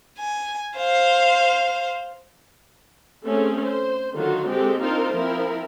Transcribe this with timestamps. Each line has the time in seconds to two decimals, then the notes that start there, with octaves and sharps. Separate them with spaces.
0.18 G#5
0.77 C5 F5
3.25 A3 C4 C#4 G#4
3.64 C5
4.14 D3 D#3 F#3 F4 F#4
4.48 G#3 C4 G4 A4
4.81 C4 D4 D#4 F4 A#4 C5
5.13 F3 C4 E4 A#4